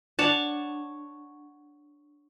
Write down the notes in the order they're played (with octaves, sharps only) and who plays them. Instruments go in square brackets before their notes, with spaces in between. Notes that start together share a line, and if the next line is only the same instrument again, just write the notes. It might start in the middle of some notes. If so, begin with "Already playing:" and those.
[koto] D4 [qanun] C#5 F#5 A5